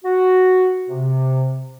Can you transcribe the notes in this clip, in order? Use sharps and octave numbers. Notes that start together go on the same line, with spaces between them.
F#4
C3